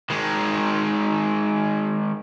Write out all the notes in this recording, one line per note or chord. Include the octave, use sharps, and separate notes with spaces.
D#3 G#3